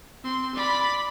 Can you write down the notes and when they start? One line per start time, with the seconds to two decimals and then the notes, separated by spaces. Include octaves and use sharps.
0.24 C4 C6
0.55 D5 B5